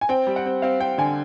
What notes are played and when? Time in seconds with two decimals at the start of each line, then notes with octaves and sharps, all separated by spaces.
0.01 G#5
0.09 C4 G5
0.27 G3
0.36 F#5
0.46 C4
0.62 C4 F5
0.80 C4 G5
0.98 D3 G#5